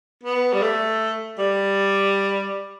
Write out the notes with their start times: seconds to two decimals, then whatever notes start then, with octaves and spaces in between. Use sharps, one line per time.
0.24 B3
0.53 G3
0.62 A3
1.39 G3